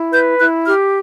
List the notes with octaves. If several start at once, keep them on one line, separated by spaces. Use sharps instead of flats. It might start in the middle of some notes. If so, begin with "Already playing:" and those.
Already playing: E4
B4 G6
E4 F#6
G4 F6